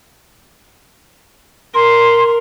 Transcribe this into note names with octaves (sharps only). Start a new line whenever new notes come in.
A#4 C6